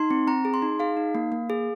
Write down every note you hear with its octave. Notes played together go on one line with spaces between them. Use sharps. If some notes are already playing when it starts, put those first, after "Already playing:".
Already playing: D#4 C6
C4
C4 A#5
G#4
C6
D#4
G#4 F5
D#4
A#3
A#3
G#4